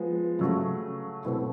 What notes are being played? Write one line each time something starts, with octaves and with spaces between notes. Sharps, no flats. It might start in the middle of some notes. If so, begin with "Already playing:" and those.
Already playing: F3 G#3 B3
C#3 F#3 A3
B2 F#3 A3 C4 E4